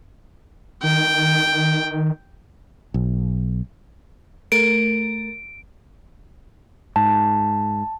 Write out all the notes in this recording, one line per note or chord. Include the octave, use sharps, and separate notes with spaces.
D#3 G5
B1
A3 A#4 D7
G#2 A5